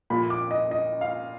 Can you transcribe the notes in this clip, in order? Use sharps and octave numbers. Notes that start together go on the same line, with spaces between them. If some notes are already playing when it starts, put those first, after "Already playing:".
A#2 F3 B5
D6
D#5
D#5
F5